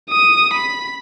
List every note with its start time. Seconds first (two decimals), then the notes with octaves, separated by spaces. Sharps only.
0.10 D#6
0.54 B5